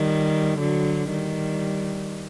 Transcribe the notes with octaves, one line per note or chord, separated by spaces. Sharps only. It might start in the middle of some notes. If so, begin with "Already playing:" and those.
Already playing: D#3 G3
D3 F#3
D#3 G3